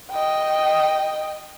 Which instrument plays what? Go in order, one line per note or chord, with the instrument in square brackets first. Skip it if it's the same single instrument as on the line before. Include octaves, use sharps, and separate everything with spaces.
[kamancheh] D#5 G5